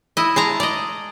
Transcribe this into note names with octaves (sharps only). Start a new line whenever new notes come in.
E4 D#5
G#3 A5 A#5
D5 D#5